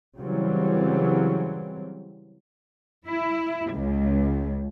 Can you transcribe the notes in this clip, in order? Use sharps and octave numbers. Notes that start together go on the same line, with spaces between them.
C#3 E3 F#3 G3 C4
E4
C#2